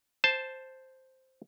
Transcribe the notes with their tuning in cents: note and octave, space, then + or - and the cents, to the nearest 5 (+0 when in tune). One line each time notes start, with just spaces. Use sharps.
C5 +0 A5 +0